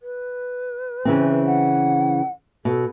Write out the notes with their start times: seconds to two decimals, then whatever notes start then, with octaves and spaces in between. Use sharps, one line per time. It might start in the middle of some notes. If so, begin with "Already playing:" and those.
0.01 B4
1.05 C#3 E3 C4
1.46 F#5
2.65 B2 A4